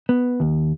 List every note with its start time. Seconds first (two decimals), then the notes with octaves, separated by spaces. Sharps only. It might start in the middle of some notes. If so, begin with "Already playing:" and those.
0.09 B3
0.40 D#2